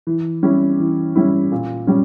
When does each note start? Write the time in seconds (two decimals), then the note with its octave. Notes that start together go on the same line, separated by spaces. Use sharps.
0.07 E3
0.43 G3 C#4 E4
0.80 E3
1.15 G3 C#4 E4
1.52 A#2
1.87 G3 C#4